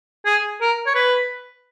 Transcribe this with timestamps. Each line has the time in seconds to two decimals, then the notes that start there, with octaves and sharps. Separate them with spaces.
0.26 G#4
0.61 A#4
0.86 C#5
0.95 B4